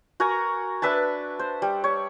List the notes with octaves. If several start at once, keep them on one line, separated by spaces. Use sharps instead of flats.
F#4 A#4 G#5 A#5
D4 B4 E5 A5
C5
G3
C#5